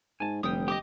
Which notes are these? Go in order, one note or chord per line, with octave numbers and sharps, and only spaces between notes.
G#2 G#5 A5
F1 D3 G3 G5 D#6
G4 D#5 D6 D#6